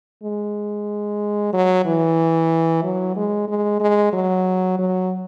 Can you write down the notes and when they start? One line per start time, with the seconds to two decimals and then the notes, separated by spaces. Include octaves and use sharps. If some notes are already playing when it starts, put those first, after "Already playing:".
0.23 G#3
1.53 F#3
1.85 E3
2.83 F#3
3.16 G#3
3.48 G#3
3.80 G#3
4.13 F#3
4.79 F#3